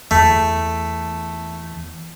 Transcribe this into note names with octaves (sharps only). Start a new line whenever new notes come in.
E2 A3